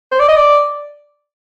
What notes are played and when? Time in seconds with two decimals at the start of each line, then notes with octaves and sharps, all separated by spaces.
0.11 C5
0.19 D5
0.28 D#5
0.36 D5